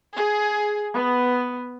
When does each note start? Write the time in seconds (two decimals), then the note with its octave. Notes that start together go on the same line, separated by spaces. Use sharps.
0.17 G#4
0.96 B3